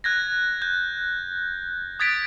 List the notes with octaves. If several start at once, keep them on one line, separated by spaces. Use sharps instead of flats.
F#6 G#6 A#6
G6
D#6 G#6 A6 B6 D7